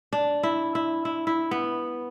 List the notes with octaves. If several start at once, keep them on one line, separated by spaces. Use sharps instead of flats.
D4
E4
E4
E4
E4
B3